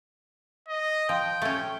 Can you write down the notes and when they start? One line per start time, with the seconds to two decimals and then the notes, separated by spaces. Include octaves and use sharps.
0.69 D#5
1.09 F3 G5
1.42 A3 C#4